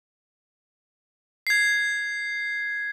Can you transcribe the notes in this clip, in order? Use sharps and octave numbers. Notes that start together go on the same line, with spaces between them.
G#6 C7